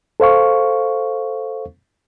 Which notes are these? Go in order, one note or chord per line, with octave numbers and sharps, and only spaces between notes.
A4 C5 F5 C#6